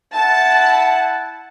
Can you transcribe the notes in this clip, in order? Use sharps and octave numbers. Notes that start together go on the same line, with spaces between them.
E4 F#5 A5